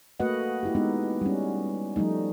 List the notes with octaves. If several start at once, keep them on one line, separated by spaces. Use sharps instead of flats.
A3 A#3 F#4 B4 D#5 F#5
A3 E4 G4
G#3 B3 D#4
G3 C#4
F3 G3 A3 D#4